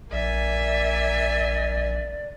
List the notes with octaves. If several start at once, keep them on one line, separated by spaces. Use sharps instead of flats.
A#1 A#3 D5 E5 G#5